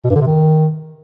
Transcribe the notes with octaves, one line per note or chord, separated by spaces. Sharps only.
B2
G2
D3
C3
D#3